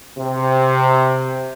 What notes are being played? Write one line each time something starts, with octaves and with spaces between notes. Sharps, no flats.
C3